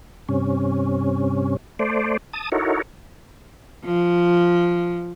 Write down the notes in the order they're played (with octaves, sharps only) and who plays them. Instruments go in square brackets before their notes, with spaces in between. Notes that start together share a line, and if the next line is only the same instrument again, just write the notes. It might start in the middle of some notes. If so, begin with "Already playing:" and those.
[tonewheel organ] G2 C3 C#4
A3 C5 D5
A5 D#6
D#4 E4 F#4 A4 A#4 C#5
[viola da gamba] F3